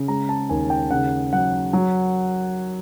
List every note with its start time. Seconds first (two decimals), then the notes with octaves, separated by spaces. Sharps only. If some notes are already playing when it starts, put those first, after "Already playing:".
Already playing: C#3
0.08 G#3 A#5
0.29 A5
0.49 D#2 G#5
0.70 G5
0.91 C#3 F#5
1.33 F#3 F#5
1.73 F#3